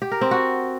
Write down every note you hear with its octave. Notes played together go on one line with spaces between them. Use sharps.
G4
A#4
C4
F#4